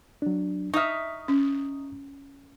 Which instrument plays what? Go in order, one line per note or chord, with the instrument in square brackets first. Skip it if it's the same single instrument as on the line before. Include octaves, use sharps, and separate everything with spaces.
[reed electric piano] F#3 D4
[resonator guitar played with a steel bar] D#4 E5 [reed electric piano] C#6 D#6 F6
[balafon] C#4